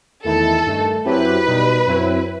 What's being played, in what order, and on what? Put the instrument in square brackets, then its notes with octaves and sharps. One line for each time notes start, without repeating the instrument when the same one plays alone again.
[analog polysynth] E2 D#3 A3 E4 [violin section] A4
[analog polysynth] G2 D#3 A3
[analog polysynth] F#2 F#3 C4 E4 G4 [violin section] B4
[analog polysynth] B2 G3 D#4
F#2 F#3 C4 E4